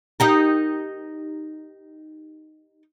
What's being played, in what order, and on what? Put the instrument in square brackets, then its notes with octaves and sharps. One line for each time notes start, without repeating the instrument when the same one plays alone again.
[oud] D#4 G4 A#4